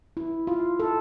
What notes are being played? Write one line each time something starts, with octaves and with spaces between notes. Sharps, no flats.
E4
F4
A4